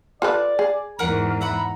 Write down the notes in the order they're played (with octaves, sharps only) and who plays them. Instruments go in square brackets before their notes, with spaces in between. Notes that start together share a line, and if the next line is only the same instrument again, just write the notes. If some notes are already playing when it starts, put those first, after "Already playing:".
[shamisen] F4 A4 B4 [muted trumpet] D5
[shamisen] G#4
[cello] E2 G#2 [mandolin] A#4 F#5 [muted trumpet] A#5
[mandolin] E5 F#5 B5